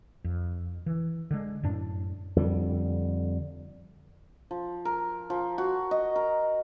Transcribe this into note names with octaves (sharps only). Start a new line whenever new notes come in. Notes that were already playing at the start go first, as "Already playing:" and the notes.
F2
E3
D3 G#3
F#2 A2 D4
F2 D3 G3
F3
A#4
F3
F#4
D#5
A#4